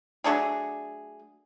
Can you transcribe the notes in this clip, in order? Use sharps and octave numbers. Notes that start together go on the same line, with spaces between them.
F#3 A3 D4 G#4